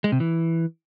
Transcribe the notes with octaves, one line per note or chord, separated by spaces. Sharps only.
G#3
C3
E3